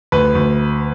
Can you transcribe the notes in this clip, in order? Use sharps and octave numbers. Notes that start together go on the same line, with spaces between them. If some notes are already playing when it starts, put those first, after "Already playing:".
D2 B4
D2